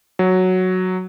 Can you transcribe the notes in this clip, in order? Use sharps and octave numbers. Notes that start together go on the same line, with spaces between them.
F#3